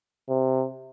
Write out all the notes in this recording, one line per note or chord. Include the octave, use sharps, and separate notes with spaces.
C3